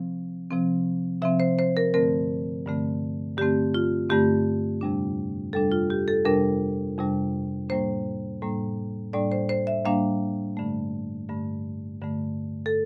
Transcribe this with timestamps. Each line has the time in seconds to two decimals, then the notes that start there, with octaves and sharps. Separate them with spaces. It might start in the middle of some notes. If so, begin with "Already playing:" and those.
Already playing: C3 F3 C4
0.51 C3 F3 C4
1.22 C3 F3 C4 E5
1.40 C5
1.59 C5
1.77 A#4
1.94 G2 D3 A3 C4 A#4
2.66 G2 D3 A3 C4
3.38 G2 D3 A3 C4 G4
3.74 F4
4.09 G2 D3 A3 C4 G4
4.81 F2 C3 G3 D4
5.53 F2 C3 G3 D4 A4
5.72 F4
5.90 G4
6.08 A4
6.25 F2 C3 G3 D4 A#4
6.98 F2 C3 G3 D4
7.69 A2 G3 A#3 D4 C5
8.42 A2 G3 A#3 D4
9.13 A2 G3 A#3 D4 D5
9.32 C5
9.49 C5
9.67 E5
9.85 A2 G3 A#3 D4 F5
10.57 G2 D3 A3
11.29 G2 D3 A3
12.01 G2 D3 A3
12.66 A4